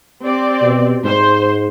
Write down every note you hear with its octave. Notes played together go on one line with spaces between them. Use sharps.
C4 G4 D5
B2
G#2 C5